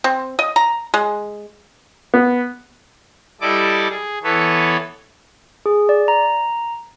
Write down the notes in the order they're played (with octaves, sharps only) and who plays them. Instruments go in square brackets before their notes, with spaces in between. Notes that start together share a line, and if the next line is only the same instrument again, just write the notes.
[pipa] C4
D#5
A#5
G#3
[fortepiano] B3
[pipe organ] G3 E4 A4 D5 D#5 D6
G#4
E3 B3 A4 B4 C#5
[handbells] G#4
D5
A#5